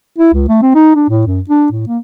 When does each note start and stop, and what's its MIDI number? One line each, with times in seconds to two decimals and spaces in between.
0.18 0.33 64
0.33 0.44 37
0.49 0.58 57
0.62 0.70 60
0.75 0.93 63
0.95 1.05 62
1.09 1.25 45
1.27 1.40 42
1.49 1.67 62
1.71 1.84 45
1.88 1.98 58